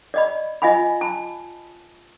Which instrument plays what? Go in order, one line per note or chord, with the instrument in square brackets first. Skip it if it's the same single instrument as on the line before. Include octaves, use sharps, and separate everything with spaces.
[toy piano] D5 D#5 B5
F4 D#5 F5 G#5 B5
A5 B5